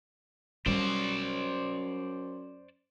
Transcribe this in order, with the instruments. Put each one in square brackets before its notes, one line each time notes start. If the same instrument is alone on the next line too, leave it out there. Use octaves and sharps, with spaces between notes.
[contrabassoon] F#2 [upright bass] G3 [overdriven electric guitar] C5 D5